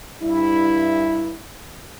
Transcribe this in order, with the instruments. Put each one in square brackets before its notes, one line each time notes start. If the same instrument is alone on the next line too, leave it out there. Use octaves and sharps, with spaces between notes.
[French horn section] G2 E4